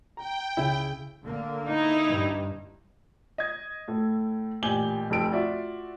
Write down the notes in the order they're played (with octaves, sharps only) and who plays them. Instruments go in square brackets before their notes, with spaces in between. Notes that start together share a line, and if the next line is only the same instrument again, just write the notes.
[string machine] G5 [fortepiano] A#5
[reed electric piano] C#2 C#3 G#4 [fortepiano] E4
[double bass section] D3 A#3
[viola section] D#4 E4
[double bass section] G2
[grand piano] D#5 G#6
A2 A4
A1 A#2 G4 G#5 G7
F1 F2 A4 D7
F4 F#4 D5 E5